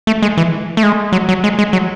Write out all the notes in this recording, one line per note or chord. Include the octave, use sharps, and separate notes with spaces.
A3
G#3
E3
A3
G#3
F#3
F#3
G#3
G#3
F#3